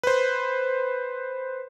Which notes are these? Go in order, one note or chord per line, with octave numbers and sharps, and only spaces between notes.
B4 C5